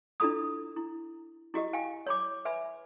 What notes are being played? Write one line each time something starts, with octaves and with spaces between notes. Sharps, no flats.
D4 E4 F4 A4 B5 D#6
E4
E4 F#4 G4 D#5
F5 G5 G#5
C#5 B5 D6
B4 E5 G#5 B5